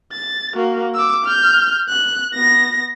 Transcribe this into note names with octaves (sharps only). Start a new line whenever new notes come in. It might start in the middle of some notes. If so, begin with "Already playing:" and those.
A6
A#3 F#4
D6 E6
F6 G6
F#6
B3 A#6